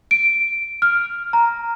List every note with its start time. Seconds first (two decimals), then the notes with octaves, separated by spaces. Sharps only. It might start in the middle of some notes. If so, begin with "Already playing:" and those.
0.11 D7
0.82 F6
1.33 A#5